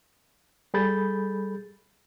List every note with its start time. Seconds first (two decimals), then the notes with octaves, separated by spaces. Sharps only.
0.74 G3 G#4 A4 B5 G6 A6